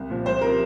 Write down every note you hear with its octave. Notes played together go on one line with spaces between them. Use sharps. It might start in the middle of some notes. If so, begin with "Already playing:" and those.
Already playing: C2
A#2 F3
C2 C5
C3 F3 A#4